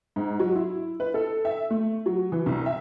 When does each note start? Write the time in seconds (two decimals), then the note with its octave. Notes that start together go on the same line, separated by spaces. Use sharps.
0.16 G#2
0.40 F#3
0.56 E4
1.00 B4
1.14 A4
1.45 E5
1.70 A3
2.06 F#3
2.32 E3
2.46 C2
2.66 E5